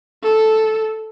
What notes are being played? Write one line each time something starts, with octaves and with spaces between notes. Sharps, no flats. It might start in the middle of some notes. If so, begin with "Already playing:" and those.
A4